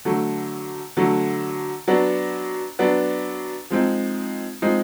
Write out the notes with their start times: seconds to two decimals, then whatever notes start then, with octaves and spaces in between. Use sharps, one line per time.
0.05 D3 F#3 A3
0.97 D3 F#3 A3
1.88 F#3 B3 D4
2.79 F#3 B3 D4
3.70 F3 G#3 C4 D#4
4.62 F3 G#3 C4 D#4